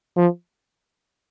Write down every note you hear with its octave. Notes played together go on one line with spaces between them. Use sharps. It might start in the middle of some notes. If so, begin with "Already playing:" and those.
F3